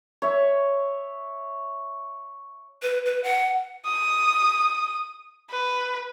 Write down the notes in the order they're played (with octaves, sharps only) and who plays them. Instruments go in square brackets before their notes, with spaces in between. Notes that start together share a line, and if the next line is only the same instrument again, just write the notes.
[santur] C#5 E5
[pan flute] B4
B4
F#5
[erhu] D#6
B4